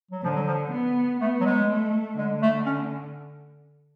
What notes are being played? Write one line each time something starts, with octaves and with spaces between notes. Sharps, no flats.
F#3
D3 F3
F#3
F3
B3
A3 B3
F#3
G#3
A3
D3 G#3
A3
C#4